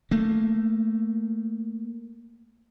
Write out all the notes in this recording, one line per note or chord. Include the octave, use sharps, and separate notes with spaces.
A3 A#3